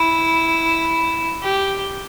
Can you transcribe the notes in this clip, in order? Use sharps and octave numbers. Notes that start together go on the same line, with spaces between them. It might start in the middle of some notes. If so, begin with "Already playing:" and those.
Already playing: E4
G4